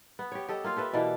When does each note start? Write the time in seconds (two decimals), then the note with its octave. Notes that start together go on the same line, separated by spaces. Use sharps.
0.19 B3
0.32 G4 C#5
0.49 G4 A4 D#5
0.64 A#3 F4 F5
0.76 G4 A4 B4 E5
0.93 B2 E3 A#3 D5